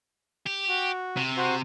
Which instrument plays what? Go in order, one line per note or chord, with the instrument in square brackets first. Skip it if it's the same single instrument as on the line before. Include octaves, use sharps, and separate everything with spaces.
[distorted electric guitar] G4
[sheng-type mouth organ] F#4
[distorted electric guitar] C3
[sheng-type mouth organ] F#4 C5